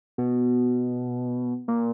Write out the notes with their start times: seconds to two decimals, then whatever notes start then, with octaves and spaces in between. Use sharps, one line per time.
0.18 B2
1.68 A#2